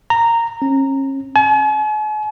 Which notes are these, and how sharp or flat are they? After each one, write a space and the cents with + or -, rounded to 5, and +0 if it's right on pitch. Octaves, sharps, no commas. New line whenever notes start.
A#5 -10
C#4 -35
G#5 +45